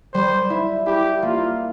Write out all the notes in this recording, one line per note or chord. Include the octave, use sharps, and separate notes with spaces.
G3 C5
E4
E4 G4
A#3 F4